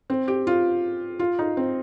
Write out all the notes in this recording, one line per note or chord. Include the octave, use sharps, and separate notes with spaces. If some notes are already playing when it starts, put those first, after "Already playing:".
C4
G4
F4
F4
D#4
C4